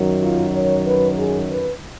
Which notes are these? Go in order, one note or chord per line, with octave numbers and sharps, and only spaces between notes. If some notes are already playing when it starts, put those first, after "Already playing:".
Already playing: F#2 D#3 F#3
F4
C#5
B4
G#4
B4